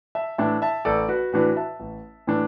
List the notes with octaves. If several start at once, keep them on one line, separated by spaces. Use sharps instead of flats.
E5 A5
A2 E3 D4 E5 A5
E5 A5
A1 A4 D5
F#4 B4
A2 E3 D4 F#4 B4
E5 A5
A1
A2 E3 D4